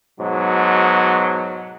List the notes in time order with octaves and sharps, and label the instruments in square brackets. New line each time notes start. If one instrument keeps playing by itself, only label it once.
[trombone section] G#2 B2 F#3